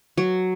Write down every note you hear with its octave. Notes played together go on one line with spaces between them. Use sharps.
F#3